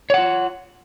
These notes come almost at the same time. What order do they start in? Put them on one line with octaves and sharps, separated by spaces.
C#5 F#5 F4